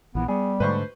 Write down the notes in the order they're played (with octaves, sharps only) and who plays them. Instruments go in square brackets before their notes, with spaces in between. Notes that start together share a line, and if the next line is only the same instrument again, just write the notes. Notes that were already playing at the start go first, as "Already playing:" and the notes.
[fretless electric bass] A#1 E3 [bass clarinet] B3
[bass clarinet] G3 [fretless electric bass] B3 [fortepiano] G#4
[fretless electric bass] G#2 D3 A3 [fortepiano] B4 C5 C#6